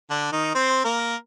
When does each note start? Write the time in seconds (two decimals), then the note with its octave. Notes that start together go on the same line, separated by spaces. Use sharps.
0.10 D3 D4
0.32 D#3 D#4
0.54 C4 C5
0.84 A#3 A#4